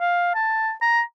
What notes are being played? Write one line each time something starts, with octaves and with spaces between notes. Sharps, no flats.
F5
A5
A#5